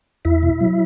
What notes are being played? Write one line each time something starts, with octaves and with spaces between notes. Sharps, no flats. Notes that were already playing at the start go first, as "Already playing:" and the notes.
E2 E4 E5
B2
F#3